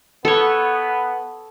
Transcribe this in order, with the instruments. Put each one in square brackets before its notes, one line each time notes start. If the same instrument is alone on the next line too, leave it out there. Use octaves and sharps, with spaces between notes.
[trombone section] B3 [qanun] A4 C#5